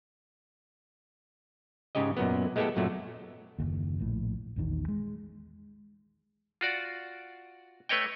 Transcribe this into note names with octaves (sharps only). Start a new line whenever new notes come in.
G#2 C#3 C#4 G4 D#5
F#2 A#2 F#3 B3
G#3 A3 B3 E4 G4 A4
F#2 A#2 F#3 A3
F#1 D#2
A#1 A2
A#1 E2 D#3
G#3
F4 F#4 D5
A3 B4 C#5 D#5 G5